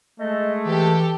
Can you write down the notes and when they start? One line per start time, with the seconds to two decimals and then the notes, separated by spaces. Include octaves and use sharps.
0.19 G#3 A3 D#5
0.65 E3 G4 A4